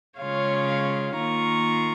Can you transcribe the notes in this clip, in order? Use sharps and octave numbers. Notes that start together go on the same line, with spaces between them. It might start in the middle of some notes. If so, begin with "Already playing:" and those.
C#3 G#3 C#4 F4 C#5 F5
D#3 A#3 F4 A#5 C#6